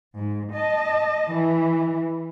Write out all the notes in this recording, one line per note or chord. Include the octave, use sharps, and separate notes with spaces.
G#2
D#5 A5
E3